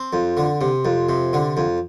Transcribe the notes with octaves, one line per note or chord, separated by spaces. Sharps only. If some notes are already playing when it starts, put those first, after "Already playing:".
Already playing: C4
F2
D3
C3
F2
C3
D3
F2